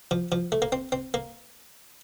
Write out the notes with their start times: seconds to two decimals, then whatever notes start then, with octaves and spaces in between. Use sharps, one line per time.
0.11 F3
0.32 F3
0.52 A3
0.62 A#3
0.72 C4
0.92 C4
1.14 A#3